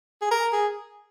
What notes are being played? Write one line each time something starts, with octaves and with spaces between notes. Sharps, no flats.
G#4
A#4
G#4